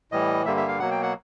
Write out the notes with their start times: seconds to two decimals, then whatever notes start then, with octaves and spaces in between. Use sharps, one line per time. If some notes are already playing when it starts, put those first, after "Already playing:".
0.12 A2 E3 G3 D#5
0.46 G2 D3 G3 A#3 E5
0.57 E5
0.68 F5
0.79 B2 F#3 A#3 F#5
0.91 G5
1.03 F#5